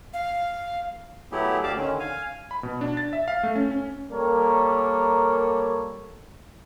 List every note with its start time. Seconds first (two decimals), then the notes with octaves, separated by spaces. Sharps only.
0.13 F5
1.32 F#3 A3 B3 E4 G4 G#4
1.63 D2 G4 D5 F5 A5 D6
1.77 D3 D#3 C#4
2.00 F5 G#5
2.51 B5
2.63 B2
2.81 D4
2.97 A6
3.13 E5
3.28 F5
3.43 A3
3.55 C#4
3.71 C#4
4.11 G3 A#3 A4 A#4 C#5